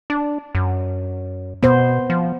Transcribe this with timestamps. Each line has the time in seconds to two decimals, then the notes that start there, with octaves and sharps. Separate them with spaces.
0.10 D4
0.55 F#2
1.63 B2 B3 C5
2.10 F3